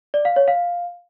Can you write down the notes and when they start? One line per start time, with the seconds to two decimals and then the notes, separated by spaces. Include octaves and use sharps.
0.14 D5
0.25 F5
0.36 C#5
0.48 F5